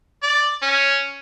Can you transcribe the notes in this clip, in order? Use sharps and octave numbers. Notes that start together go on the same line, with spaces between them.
D5
C#4